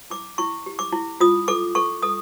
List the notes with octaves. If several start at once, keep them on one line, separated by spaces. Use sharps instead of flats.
E4 D6
E4 C#6
G4
D6
E4
F4 D#6
A4 D6
A4 C#6
A4 D#6